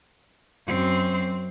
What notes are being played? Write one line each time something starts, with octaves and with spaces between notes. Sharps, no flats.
F#2 C4